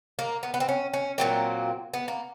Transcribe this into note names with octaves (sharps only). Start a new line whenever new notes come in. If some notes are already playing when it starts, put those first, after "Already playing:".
A#3
B3
B3
C4
C#4
C#4
A#2 F#3 A#3 C4
B3
A#3